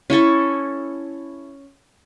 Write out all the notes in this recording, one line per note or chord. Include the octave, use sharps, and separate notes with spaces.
C#4 E4 A4 C#6